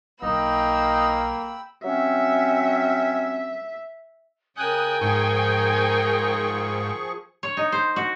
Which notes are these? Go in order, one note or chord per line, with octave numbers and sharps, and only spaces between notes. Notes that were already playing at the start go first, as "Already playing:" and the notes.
B1 A#3 D#4 G5 B5 E6
F#3 C4 C#4 E5
C#3 A#4 G5 G#5 D#6 F#6
G#2 F3 G#4 C#6
C#5
D#4
C5
F#4